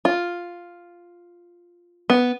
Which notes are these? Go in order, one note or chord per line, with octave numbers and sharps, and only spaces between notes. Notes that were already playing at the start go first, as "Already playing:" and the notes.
F4
B3